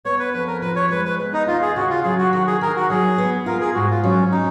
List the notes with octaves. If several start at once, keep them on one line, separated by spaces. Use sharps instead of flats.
B3 C#5
B4
F2 B4
A#4
F3 B4
C#5
G#3 B4
B4
B3
D#4
D#2 F4
G#4
C#3 F#4
F4
F#3 G#4
F#4
D#3 F#4
G#4
D#3 A#4
F#4
F#3 G#4
B3
F4 A#4
G#4
G#2 F#4
F4
F#3 C#4
C#4 D#4